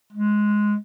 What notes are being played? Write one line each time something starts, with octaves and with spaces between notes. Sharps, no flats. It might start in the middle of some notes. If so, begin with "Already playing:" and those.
G#3